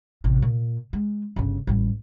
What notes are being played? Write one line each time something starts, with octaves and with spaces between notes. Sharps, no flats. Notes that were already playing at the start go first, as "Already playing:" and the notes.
A1 C3
A#2
G#3
G1 C#3
A1 G3